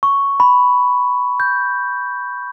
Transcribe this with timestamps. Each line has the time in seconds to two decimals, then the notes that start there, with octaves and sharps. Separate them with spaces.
0.03 C#6
0.40 B5
1.40 G6